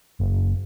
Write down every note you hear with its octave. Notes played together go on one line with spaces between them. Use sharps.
F#1